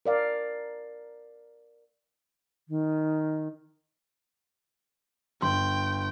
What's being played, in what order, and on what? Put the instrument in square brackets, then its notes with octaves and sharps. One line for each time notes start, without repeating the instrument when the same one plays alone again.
[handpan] A#4 D5 F5
[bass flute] D#3
[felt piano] G1 [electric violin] G5 [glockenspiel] C6